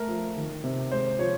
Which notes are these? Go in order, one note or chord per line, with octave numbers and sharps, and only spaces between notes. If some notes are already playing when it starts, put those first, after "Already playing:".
Already playing: A3 A#4
F3
D#3
C3
G#3 C5
F3 C#5